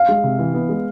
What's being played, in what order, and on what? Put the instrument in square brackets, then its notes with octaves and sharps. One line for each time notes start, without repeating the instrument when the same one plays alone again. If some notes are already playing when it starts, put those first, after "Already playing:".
Already playing: [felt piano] F5
[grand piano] G#3
C3
E3
B3
G#3